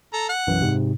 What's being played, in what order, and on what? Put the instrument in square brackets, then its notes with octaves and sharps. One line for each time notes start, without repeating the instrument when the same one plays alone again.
[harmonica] A4 A#5
F#5
[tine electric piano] B1 F#2 E3
G#2 C3